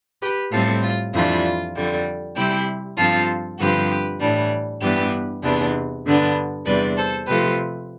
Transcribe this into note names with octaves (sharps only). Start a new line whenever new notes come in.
G4 B4
A2 G3 C4 F4 A4
F4
F2 E3 G3 D4 F4
F2 D3 G3
C3 G3 C4 E4 G4
G2 F3 C4 F4 A4
G2 D3 F3 C4 G4 B4
A2 E3 G3 D4
G2 E3 B3 D4 G4 B4
E2 C3 E3 B3 D4
G2 D3 G3 B3 D4
E2 C3 G3 D4 B4 D5
A4 C5
C3 F3 A3 G4 B4